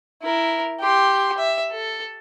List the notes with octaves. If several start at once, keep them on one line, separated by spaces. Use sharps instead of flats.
E4 A#4
G4 C6
E5
A4